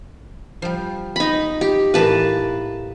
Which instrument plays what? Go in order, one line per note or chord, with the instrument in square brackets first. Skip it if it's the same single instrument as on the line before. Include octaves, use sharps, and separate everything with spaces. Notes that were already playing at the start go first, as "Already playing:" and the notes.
[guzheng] F3 G3
[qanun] D#4 B5
G4
[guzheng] A2 E3 A#3 [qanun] B4 A5